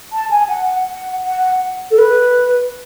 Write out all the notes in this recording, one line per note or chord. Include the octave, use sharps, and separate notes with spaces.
A5
G#5
F#5
F#5
F#5
A4
B4